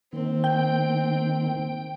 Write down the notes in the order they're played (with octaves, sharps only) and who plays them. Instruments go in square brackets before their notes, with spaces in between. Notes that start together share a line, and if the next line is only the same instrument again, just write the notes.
[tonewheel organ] D#3 A#3 [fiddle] C4
[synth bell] G5